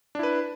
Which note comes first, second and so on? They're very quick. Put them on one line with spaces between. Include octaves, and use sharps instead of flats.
D4 E4 B4